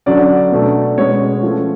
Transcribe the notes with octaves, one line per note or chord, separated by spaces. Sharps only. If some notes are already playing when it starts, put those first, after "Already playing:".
D3 F#3 C#4 D5
B2 A3 D4
B2 G#3 C#4 C#5
F3 A3 C#4